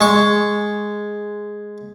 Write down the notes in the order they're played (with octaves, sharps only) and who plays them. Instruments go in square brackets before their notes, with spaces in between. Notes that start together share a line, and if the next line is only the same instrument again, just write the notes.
[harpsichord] G#3 C#6